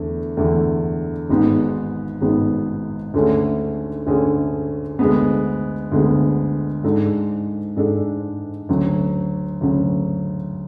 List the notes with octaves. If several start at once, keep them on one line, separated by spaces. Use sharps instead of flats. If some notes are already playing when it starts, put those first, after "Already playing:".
Already playing: E2 D3 A3
E2 D3 A3
G#1 G#2 G#3 B3
G#1 G#2 G#3 B3
D2 D3 A3 C#4 G#4
D2 D3 A3 C#4 G#4
D2 D3 G#3 B3
D2 D3 G#3 B3
G#2 G#3 D4 A4
G#2 G#3 D4 A4
D2 C#3 F#3
D2 C#3 F#3